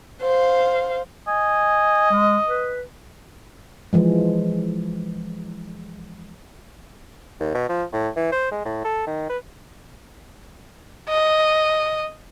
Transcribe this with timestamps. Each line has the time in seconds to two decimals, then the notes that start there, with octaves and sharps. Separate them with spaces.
0.22 C5 F5
1.27 D#5 G#5
2.11 G#3
2.48 B4
3.93 E3 F3 G#3
7.40 D#2
7.54 B2
7.69 F3
7.93 A2
8.16 E3
8.32 C5
8.51 G#3
8.65 A2
8.84 A4
9.07 D#3
9.30 B4
11.09 D#5